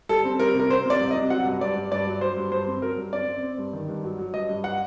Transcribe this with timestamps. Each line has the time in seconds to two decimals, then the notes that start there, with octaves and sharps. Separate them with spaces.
0.09 G3 A4
0.25 C4
0.39 G3 A#4
0.55 C3 A#4
0.70 C4 C5
0.86 C3 D5
1.00 C2
1.11 D#5
1.15 C3
1.30 F#3 F#5
1.46 G2
1.61 G2 D5
1.76 G2
1.91 G2 D5
2.07 F#3
2.21 F#3 C5
2.37 G2
2.52 G2 C5
2.67 C4
2.82 F#3 A#4
2.98 G2
3.12 C4 D5
3.28 C4
3.43 C4
3.58 G2
3.73 D#3
3.88 G2
4.04 F#3
4.19 F#3
4.34 G2 D#5
4.49 G2
4.64 F#5